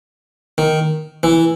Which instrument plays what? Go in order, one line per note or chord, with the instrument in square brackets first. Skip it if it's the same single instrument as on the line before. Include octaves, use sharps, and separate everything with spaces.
[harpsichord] D#3
E3